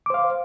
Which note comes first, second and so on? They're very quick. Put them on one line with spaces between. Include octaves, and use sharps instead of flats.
D6 C5 F5